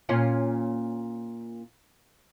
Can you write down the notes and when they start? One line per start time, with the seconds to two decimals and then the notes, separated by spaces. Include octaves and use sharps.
0.09 A#2 C#4 F4